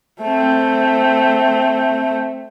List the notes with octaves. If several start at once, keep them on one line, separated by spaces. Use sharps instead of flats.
A3 C4